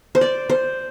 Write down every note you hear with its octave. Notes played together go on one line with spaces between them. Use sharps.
C5
D5
C5